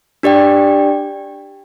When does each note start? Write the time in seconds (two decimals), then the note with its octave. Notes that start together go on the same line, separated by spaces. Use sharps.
0.23 D4 G4 D5 G5